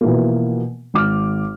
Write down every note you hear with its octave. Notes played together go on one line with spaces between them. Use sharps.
B2 E3 F3 A#3
G#1 D6 F6